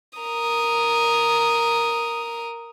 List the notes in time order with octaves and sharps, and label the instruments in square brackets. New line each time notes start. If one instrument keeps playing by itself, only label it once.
[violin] A#4 D#6